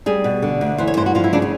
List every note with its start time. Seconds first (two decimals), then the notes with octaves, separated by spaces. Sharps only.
0.06 G3 G#4
0.24 B2
0.42 D3
0.61 D2
0.78 E3 C5
0.87 C#5
0.97 G2 C5
1.06 F#4
1.15 F3 F4
1.24 E4
1.33 C#3 D4
1.42 C#4